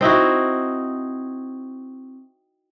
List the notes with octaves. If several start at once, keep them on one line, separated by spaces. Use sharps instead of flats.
C4 D#4 E4 F#4